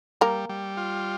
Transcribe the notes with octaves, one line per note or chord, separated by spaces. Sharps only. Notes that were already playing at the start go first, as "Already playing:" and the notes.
G3 A#3 A#4
G3
F4